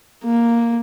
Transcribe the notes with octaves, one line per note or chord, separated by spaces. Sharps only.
A#3